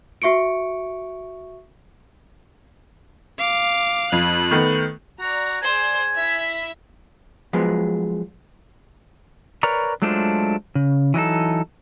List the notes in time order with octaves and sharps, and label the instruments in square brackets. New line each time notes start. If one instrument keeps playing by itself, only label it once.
[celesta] F#4 E5 C#6 C#7 D7
[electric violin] F5 D6
[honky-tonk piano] F2 [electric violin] F#6
[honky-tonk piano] D#3 A3 B3
[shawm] F#4 [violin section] D5 A#5
[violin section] G#4 C5 D5 [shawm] G#5
[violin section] E4 E5 B6
[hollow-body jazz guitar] F3 F#3 G#3 B3
[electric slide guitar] A#4 B4 C#5 D5 A#5
F#3 G#3 A3 D4 F4 C5
C#3
E3 F#3 D#4 A4